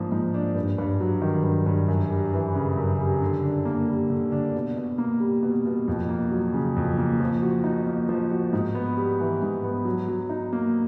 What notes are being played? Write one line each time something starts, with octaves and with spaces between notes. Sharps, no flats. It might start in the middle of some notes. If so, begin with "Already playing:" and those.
Already playing: G#2 F3 A#3 D4
G#2
D4
G2
G2
F#3
D#3
G2
G2
F#2
G3
E3
C#3
F#2
G3
D3
D4
A#3
G3
D3
D4
B2
B2
A#3
G3
B2
B2
F2
A#3
F#3
C#3
F2
A#3
F3
F#4
D#4
A#3
F3
F#4
G#2
B3
G3
E3
G#2
B3
F#3
F#3
D#4
A#3